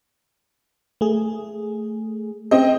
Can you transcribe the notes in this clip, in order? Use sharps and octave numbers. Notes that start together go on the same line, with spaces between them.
A3 G#4
C4 D#5